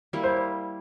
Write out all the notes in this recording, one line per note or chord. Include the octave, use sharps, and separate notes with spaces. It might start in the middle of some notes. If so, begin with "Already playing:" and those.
G3 A#3 E4
C5